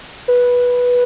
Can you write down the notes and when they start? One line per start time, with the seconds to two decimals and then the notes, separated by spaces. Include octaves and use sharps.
0.28 B4